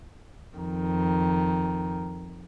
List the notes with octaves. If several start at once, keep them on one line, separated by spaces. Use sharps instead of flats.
F2 D#3